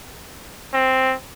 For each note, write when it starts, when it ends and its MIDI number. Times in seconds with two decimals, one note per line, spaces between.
0.73 1.15 60